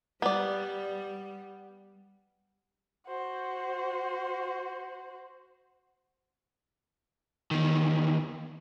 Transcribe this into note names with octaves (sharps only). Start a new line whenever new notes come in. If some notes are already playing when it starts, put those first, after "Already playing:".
G3 B3 D5
F#4 C5
E2 D#3